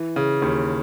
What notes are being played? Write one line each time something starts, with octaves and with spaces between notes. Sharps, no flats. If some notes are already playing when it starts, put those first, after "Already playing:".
Already playing: E3
C#3
D#2